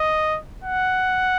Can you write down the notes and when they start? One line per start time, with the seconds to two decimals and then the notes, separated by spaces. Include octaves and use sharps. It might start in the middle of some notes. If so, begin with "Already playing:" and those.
Already playing: D#5
0.64 F#5